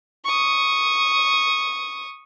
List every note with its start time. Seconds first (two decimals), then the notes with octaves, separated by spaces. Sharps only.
0.25 C#6 D#6